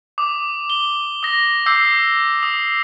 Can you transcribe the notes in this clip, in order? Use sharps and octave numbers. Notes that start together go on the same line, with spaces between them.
D6 D#6
G7
D#6 A#6
D6 E6 G6 C7
D#6